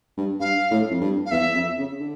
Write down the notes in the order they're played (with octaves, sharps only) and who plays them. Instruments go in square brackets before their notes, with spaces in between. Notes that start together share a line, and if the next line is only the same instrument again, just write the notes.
[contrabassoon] G2
[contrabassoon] G2 [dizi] F5
[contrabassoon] A2
F2
G2
[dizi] F5
[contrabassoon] E2 [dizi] E5
[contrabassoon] F2
C#3
D3